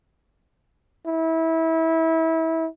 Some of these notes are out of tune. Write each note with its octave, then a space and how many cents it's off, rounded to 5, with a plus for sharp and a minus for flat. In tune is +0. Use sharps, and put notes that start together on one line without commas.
E4 -25